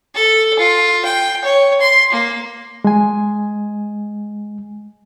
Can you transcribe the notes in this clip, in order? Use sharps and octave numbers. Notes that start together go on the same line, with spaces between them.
A4
F4
G5
C#5
C6
A#3
G#3 G#5